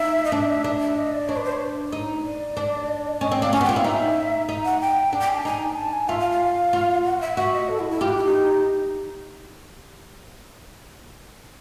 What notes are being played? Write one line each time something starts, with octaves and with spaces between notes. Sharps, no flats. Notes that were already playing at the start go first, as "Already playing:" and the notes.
Already playing: D#4 E5
D#5
D4 E5
D4
E5
D#5
D5
D4 C#5
B4
C5
C#5
D#4
D5
D4
C#4 D#5
C4
D4 F5
C#4 G#5
B3
G5
F4
E4 F5
D#4 E5
D#4
F#5
G5
D4
G5
G#5
A5
D#4 G#5
A5
G#5
F4 E5
F5
F5
F4
F#5
E5
F#4 E5
D#5
A4
E4
E4
F4 G4
F#4
E4
D#4